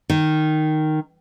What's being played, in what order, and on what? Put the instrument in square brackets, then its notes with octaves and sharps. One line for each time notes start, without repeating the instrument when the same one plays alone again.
[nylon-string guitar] D#3